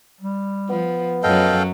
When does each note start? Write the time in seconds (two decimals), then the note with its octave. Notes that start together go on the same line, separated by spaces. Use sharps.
0.21 G3
0.70 F3 B3
1.23 F#2 F#3 A4 D#5 F5 G5